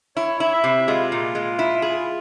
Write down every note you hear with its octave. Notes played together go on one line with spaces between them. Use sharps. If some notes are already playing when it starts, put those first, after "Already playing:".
E4 C#5
E4
E5
C3
G#3 F4
A#2
G#3
E4
G#4